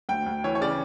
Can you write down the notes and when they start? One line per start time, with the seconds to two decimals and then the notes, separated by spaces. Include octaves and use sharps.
0.09 D2 G5
0.26 D2
0.44 E3 C#5
0.55 C#5
0.61 C#3 D5